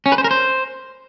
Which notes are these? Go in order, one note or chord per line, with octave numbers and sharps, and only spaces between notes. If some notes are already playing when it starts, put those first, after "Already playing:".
C#4
B4
C5
A#4
C5